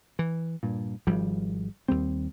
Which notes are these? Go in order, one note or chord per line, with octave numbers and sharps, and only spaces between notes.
E3
G2 A#2
G#1 F3 G3
D#2 G3 C4